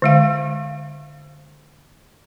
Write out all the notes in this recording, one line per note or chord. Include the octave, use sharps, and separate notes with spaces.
D3 G#3 F5